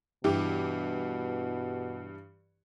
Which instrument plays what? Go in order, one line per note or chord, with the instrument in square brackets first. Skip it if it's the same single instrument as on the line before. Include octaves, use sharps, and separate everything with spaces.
[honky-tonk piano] G2 E3 G4 [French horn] B2